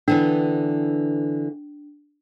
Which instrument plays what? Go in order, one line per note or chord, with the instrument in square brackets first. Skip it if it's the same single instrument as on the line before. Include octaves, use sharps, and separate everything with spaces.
[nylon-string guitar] D3 E3 B3 [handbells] D4